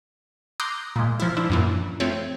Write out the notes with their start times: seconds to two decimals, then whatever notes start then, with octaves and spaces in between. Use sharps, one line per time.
0.60 A#5 C6 D6 D#6 F#6 G6
0.96 A#2 G#3
1.20 F3 E4
1.37 F3 D4 E4
1.50 F#2 A#2 E3
2.00 F3 A3 C4 C#5